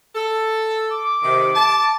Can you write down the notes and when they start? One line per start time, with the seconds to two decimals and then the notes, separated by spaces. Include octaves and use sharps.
0.15 A4
0.90 D6
1.23 C3 D#3
1.55 A5